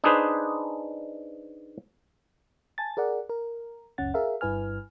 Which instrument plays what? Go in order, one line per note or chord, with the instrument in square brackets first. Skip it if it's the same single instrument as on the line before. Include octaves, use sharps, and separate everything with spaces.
[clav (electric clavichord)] D4 D#4 G#4 B4 C5
[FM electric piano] G#5 A5 A6
G#4 A#4 D5 F#5
A#4
G1 C#2 F#2 C#4 F#5 A6
G#4 A#4 E5 F5
G1 G2 E4 B4 G#5 F6